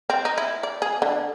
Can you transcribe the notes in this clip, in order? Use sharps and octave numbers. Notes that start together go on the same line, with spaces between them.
C4
D#4
E4
D5
G#4
D3